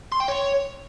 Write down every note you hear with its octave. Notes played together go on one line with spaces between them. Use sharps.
C6
G5
C#5